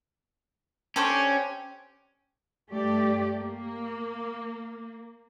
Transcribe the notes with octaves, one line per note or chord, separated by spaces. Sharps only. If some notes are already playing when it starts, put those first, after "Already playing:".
C#4 D4 G4 A4 C5 C#5 G5
G2 A3 G4 D5
A#3